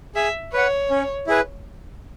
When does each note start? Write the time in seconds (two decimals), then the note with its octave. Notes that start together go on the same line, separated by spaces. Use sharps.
0.15 G#4 E5
0.53 B4 C#5 F#5
0.90 C#4
1.27 E4 G#4 B4